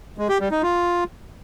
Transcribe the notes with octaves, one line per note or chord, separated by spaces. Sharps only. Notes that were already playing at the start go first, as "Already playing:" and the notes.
G#3
G4
G3
D#4
F4